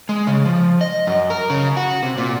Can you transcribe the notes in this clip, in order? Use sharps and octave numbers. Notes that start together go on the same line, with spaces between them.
G#3
C#3
F3
D#5
F#2
A#4
C#3
F#4
C3
A#2